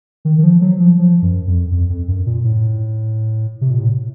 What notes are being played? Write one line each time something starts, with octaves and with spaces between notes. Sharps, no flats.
D#3
D#3
F3
F#3
F3
F3
F#2
F2
F2
F2
F#2
A#2
A2
C3
A#2
A2